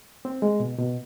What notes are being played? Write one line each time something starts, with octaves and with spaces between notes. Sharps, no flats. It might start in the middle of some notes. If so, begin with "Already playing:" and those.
C4
G#3
B2
B2